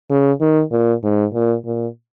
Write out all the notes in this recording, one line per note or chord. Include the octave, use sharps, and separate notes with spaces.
C#3
D#3
A#2
G#2
A#2
A#2